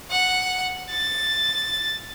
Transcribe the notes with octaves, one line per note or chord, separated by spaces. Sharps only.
F#5
A6